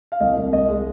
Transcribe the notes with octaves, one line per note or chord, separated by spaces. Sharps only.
F5
C2 D#5
C2
C2 D#5
G#3